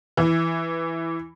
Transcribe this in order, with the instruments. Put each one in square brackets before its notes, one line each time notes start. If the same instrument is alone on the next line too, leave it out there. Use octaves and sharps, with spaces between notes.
[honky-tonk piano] E3